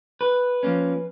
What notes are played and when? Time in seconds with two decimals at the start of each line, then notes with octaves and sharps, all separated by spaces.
0.21 B4
0.63 F3 A#3 C#4